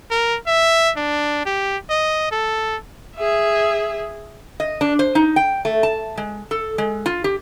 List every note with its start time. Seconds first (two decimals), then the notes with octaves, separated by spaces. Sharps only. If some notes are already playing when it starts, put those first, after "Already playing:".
0.11 A#4
0.47 E5
0.97 D4
1.46 G4
1.90 D#5
2.31 A4
3.16 G#4 E5
4.60 D#5
4.81 D4
4.99 C5
5.15 D#4
5.36 G5
5.65 A3
5.83 A5
6.17 G#3
6.51 A4
6.78 G#3
7.06 F4
7.24 G4